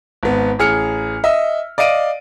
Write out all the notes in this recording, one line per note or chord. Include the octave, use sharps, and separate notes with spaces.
G#1 B3
A1 G#4 F6 C#7
D#5 E5
D5 D#5 F5 D7 D#7